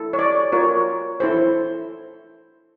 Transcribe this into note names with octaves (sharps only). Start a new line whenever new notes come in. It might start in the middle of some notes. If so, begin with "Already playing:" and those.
Already playing: E4 A4
C#5
D5
F4 A#4 C#5
E4 A4 C5